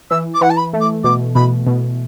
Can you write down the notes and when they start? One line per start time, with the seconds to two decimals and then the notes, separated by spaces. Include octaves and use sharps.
0.10 E3 E6
0.34 D6
0.41 E3 F#5
0.50 A5
0.57 B5
0.73 A3
0.80 D6
1.04 B2 D6
1.35 B2 B5
1.67 B2